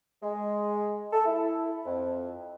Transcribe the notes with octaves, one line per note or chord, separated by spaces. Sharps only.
G#3
A4
E4
F2